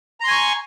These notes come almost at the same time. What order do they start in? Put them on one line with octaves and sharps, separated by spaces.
A#5 C6 G#5 C#6